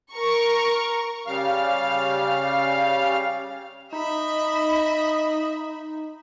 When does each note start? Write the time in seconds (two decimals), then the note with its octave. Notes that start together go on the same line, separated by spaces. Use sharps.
0.13 A#4 C#6
1.27 C#3 G3 F5 F6
3.92 D#4 D#5 E5 B5